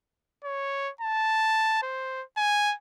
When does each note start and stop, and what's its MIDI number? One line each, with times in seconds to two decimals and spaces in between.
0.44 0.90 73
1.01 1.81 81
1.82 2.23 72
2.37 2.74 80